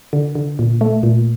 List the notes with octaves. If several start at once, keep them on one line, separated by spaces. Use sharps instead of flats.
D3
D3
A#2
A3
A#2